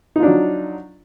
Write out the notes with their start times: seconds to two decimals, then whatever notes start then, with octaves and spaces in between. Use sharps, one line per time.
0.16 D#4
0.19 F4
0.23 D4
0.26 F#3